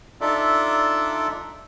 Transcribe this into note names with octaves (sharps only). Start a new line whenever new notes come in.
D4 D#4 F4 A4 D5 E5